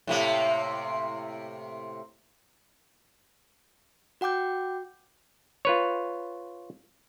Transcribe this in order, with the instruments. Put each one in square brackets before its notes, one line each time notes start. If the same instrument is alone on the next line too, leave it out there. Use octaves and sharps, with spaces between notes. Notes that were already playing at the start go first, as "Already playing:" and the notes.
[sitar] A2 C3 A#3
[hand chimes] F#4 F#5 G5 D6 G6
[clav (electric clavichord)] F4 B4 C#5